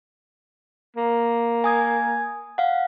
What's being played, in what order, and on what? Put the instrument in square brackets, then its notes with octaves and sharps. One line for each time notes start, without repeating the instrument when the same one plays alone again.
[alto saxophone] A#3
[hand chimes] G#5 D#6 G#6
F5 F#5